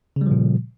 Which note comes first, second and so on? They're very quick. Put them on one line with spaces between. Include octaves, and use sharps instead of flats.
C#3 G3 F3 A#2